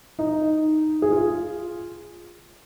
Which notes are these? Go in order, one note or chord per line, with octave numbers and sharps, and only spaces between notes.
D#4
G#4
F4